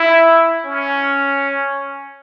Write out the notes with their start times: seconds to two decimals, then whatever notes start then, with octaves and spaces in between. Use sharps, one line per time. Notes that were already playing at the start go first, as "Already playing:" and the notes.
Already playing: E4
0.65 C#4